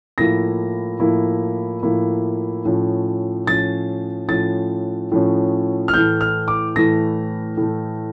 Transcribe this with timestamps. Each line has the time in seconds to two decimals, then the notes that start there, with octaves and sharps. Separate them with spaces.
0.18 A2 F3 A#3 E4 A#6
1.00 A2 F3 A#3 E4
1.83 A2 F3 A#3 E4
2.65 A2 F3 C#4
3.47 A2 F3 C#4 A6
4.28 A2 F3 C#4 A6
5.12 A2 F3 C#4
5.88 F6
5.93 A2 E3 A3 G6
6.21 F6
6.48 D6
6.76 A2 E3 A3 A#6
7.57 A2 E3 A3